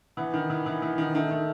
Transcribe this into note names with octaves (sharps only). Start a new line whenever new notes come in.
E3 B3
D#3
E3
E3
E3
D#3
D#3 A3
D#3